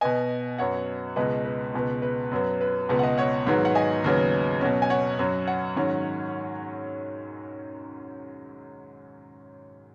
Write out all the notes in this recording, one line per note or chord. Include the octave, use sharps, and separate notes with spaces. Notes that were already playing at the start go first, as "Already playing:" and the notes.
B2 B3 D#5 G#5
F#2 F#3 B3 C#5 F#5
C#2 B2 G#3 B4 D#5
B4
C#2 B2 G#3 B3
B4
F#2 F#3 B3
B4
C#2 B2 B3 B4
F#5
B4 D#5
C#5 F#5
G#2 D#3 F#3 B3
F#5
D#5 G#5
D#2 C#3 F#3 B3
B2 F#3 C#4
G#5
C#5 F#5
F#2 F#3 C#4
C#5 F#5
G#2 D#3 F#3 C#4